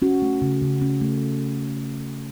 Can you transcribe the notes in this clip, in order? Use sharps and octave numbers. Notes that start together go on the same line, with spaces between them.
C#4 F#4
A3
C#3
C#3
C#4
A3